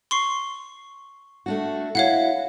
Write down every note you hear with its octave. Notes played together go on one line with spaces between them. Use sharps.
C6 C#6 C7
A3 D4 F#4
E4 F#4 C#5 F5 F#5